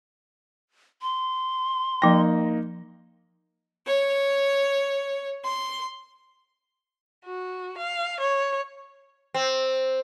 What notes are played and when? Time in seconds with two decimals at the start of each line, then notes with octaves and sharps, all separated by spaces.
1.02 C6
2.02 F3 A#3 D#4 G5 A#6
3.86 C#5
5.44 C6
7.25 F#4
7.78 F5
8.20 C#5
9.34 C4